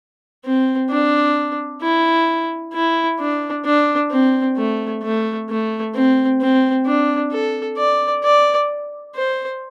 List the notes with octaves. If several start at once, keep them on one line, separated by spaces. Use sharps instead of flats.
C4
D4
E4
E4
D4
D4
C4
A3
A3
A3
C4
C4
D4
A4
D5
D5
C5